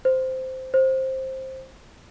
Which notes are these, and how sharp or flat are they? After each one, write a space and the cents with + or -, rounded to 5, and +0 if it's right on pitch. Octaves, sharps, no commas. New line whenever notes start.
C5 -10
C5 +10